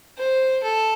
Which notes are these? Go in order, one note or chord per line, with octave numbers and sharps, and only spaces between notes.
C5
A4